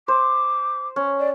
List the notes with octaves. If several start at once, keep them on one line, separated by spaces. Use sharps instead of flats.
C5 D6
C#4
D5